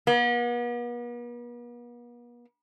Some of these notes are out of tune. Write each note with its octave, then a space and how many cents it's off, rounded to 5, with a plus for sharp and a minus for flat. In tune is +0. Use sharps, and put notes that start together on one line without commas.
B3 -45